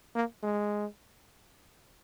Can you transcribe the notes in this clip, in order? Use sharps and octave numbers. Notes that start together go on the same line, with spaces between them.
A#3
G#3